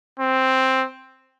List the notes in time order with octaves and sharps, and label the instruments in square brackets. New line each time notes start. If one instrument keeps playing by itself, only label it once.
[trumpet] C4